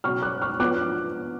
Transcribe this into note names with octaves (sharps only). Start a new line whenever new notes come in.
B2 F#3 C#4 C#6 F6
D6 F#6
C#6 F6
F3 B3 D4 D6 F#6